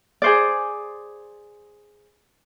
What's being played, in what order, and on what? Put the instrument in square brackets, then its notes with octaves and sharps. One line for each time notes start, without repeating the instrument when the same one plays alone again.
[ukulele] G#4 C5 D5